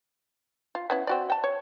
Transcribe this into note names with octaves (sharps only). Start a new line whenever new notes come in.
F4
B3 C#4 E4
C4 F#4 D5
G5 A5
C#5